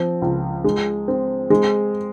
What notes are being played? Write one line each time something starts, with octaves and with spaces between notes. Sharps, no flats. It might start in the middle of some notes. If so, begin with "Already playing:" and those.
Already playing: F3 C4
C#2
G#3
C4
G#3